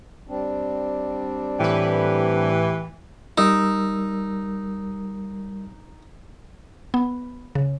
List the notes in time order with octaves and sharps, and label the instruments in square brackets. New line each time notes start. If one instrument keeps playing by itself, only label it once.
[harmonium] G3 C4 D4
[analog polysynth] A2 B4 [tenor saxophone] E3 [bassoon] G4
[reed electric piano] G3 A#4 E6 [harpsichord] D#4
[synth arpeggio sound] B3
C#3